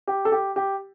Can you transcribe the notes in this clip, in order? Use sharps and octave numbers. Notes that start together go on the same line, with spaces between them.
G4
A4
G4
G4